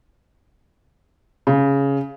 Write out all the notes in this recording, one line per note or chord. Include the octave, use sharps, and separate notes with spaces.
C#3